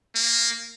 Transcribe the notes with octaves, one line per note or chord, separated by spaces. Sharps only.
A#3